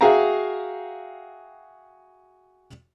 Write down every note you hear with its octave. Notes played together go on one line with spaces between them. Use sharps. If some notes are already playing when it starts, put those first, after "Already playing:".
F#4 G#4 E5 F5 G5 A#5